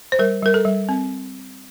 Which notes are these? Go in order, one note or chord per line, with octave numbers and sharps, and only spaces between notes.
C5
G3 A#4
G3 A#4
A4
G3
C4